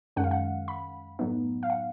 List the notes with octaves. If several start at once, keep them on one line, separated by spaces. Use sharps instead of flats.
F#2 D#3 G#3 C#4 F#5
F5
F#5
B5
A2 F#3 B3 D#4
F5
F#5